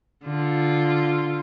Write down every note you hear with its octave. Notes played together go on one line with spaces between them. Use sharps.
D3 F4